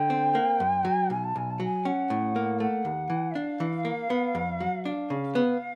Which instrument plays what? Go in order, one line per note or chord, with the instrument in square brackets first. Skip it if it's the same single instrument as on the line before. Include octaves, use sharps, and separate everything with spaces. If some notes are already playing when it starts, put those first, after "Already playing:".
Already playing: [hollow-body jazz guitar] D3 [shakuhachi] G5
[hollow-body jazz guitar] C4
A#3
F#2
F#3
[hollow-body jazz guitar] B1 [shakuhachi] G#5
[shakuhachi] A5
[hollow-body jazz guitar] B1 [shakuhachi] G#5
[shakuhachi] A5
[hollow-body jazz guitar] F#3 [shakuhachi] G#5
[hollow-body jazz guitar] C#4 [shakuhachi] F#5
[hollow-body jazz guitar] A2
A#3
[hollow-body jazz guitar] A3 [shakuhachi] F#5
[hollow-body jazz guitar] D#2
E3
[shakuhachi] E5
[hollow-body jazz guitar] D4 [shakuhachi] F5
[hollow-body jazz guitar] E3
A#3
B3
F2
F#3
[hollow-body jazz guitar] D4 [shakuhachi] F5
[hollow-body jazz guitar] C#3
B3